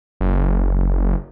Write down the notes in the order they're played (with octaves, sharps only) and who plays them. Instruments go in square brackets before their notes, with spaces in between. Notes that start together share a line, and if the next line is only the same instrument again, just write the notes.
[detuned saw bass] F#1